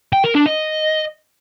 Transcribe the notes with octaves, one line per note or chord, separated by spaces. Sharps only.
G5
A#4
D4
D#5